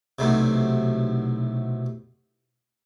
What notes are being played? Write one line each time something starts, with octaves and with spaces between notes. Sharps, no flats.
B1 A2 C3